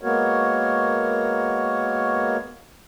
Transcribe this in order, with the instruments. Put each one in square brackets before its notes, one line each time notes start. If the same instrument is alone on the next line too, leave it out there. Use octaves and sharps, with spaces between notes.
[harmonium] G#3 A#3 B3 F#4 A#4 C#5